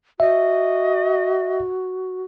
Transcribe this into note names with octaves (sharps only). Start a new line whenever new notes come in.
F#4 D#5 E5